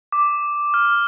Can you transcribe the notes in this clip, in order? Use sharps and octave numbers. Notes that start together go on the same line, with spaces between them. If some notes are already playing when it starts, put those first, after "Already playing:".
D6
F6